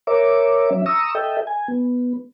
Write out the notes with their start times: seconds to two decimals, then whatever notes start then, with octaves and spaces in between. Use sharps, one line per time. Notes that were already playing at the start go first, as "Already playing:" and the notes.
0.07 A#4 C#5 E5 D6
0.70 F#3 C#4 E5
0.86 A#5 C#6 D#6 E6
1.15 A4 D#5 E5 G5
1.47 G#5
1.68 B3